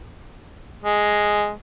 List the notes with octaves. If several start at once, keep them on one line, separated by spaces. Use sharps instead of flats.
G#3